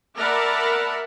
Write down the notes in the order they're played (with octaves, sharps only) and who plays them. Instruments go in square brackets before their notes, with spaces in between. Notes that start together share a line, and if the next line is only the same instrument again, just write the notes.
[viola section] A#4 D5 E5 F#5 A5 B5